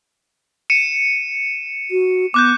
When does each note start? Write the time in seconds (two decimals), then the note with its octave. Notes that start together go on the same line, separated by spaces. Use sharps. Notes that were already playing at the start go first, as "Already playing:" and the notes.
0.70 C#7 D#7 E7
1.91 F#4
2.34 B3 D6 F#6 G6